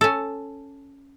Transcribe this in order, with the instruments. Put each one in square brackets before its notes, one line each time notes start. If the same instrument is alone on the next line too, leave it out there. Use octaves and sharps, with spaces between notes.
[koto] C#4 A4